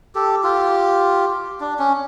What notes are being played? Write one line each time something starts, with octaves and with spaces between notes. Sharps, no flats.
G4 A4
F4 G4
D4
C#4